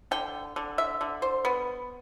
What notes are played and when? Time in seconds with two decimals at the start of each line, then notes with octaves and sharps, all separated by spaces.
0.11 D3 G5
0.56 D3
0.78 E5
1.01 D3
1.22 C5
1.45 B3